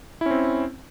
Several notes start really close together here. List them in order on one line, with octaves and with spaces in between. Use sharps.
E4 C#4 C4